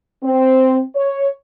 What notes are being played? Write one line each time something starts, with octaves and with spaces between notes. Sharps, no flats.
C4
C#5